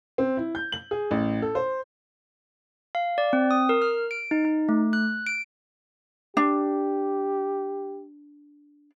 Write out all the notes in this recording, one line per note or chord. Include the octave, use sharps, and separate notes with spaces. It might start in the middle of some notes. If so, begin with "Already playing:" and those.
C4
E4
G6
F#7
G#4
A1
A4
C5
F5
D5
C4
D#6
A#4
F6
D7
D#4
D#4
A3
F#6
D7
D4 G4